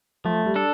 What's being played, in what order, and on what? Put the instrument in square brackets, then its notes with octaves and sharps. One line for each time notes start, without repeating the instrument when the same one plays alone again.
[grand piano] F3 [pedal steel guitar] A3
[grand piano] G3
[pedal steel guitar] D4 A4